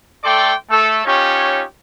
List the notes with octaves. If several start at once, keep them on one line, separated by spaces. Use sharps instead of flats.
A3 A4 D5 G5 C6 D6
A3 A4
C#4 D#4 F4 G4 C#5